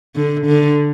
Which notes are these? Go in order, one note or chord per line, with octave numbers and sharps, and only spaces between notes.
D3
D3